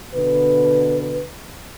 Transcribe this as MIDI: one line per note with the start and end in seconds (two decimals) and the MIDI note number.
0.14 1.23 47
0.14 1.23 50
0.14 1.23 71